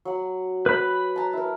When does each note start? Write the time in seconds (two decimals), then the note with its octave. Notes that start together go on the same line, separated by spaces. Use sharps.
0.05 F#3 F#5
0.66 B4 B5
1.16 A5 A#5
1.33 E4 A#4